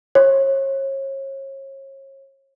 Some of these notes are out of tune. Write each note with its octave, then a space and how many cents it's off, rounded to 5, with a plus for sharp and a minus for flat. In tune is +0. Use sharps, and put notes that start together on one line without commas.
C#5 -35